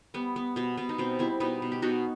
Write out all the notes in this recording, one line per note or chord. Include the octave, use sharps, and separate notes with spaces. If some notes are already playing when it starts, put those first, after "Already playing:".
G3 B3
B3
B2 B3
B2 B3
D#4
B2 C4
G3 C4 E4
B2 B3 D#4
B2
G4
B2 D#4 F#4